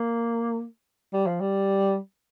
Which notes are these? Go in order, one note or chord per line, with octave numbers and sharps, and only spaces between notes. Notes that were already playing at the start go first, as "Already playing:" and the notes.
Already playing: A#3
G3
F3
G3